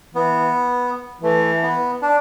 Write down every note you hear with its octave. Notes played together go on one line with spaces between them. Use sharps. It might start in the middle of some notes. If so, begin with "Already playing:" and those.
E3 B3
E3 A3
B3
D4